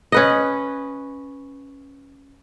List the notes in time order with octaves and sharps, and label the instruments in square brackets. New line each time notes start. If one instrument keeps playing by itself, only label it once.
[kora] C#4 B4 D#5